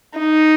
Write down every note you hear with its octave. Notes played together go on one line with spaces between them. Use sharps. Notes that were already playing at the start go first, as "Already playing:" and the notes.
D#4